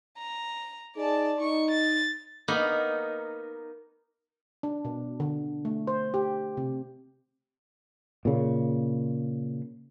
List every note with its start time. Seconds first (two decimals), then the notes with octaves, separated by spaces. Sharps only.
0.18 A#5
0.96 D#4 G#4 D5 A5
1.40 D#4 C#6
1.71 A6
2.48 A#3 B3 D#4
4.63 D4
4.85 B2
5.20 D3
5.65 A3
5.87 C5
6.14 G4
6.57 C3
8.25 A#2 C#3